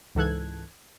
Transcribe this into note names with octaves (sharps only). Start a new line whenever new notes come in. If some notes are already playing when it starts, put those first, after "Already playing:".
C#2 G#2 E3 A4 F#6 G#6